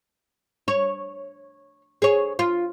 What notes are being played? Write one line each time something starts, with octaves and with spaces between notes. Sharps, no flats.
C#5
G#4 C#5
F4